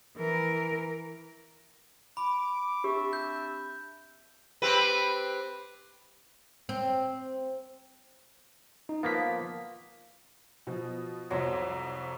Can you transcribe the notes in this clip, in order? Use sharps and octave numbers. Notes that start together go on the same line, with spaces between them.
E3 A#4
B5 D6
C4 D4 G4 E5
G6
C4 G4 B4
C4
D#4
F3 A#3 B3 F5 B6
B2 F3
C2 F2 F#3 C6